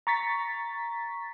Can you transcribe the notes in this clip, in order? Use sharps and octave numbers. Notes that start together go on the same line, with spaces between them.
A#5 C#6 A6 B6